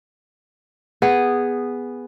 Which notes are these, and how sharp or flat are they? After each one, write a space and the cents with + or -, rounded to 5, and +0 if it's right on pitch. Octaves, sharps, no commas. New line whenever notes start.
B3 +0 G#4 -10